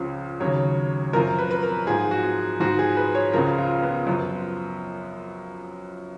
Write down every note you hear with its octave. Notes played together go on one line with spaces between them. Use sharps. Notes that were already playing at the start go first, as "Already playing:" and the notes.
Already playing: C#2 C#3 F3
D#2 C#3 F#3 C#5
F#2 F3 A#4
B4
B4
A#4
G#2 F3 G#4
F#4
G#2 F3 F#4
G#4
B4
C#5
C#2 C#3 F3 A#4
F4
B3
F#2 F3 B3